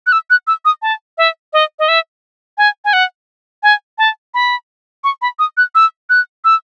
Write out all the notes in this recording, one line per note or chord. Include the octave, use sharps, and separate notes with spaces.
F#6
E6
F#6
E6
D#6
A5
E5
D#5
D#5
E5
G#5
G#5
F#5
G#5
A5
B5
C#6
B5
D#6
F#6
E6
F#6
E6